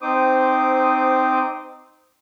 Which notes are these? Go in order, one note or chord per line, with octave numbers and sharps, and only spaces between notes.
C4 D#4 C5 D6 D#6